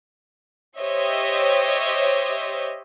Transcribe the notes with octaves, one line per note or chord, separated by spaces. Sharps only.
G4 C5 C#5 D#5 E5